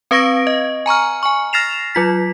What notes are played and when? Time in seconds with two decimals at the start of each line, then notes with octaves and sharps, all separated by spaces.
0.11 C4 B4 F5 C#6 A#6 D7
0.47 D#5
0.86 G#5 A#5 C#6 F6
1.23 G#5 C#6
1.53 F6 A6 A#6 C7 E7 F7
1.95 F#3 F4 B6